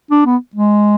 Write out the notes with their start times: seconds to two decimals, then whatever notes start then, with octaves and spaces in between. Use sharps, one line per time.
0.11 D4
0.26 B3
0.55 G#3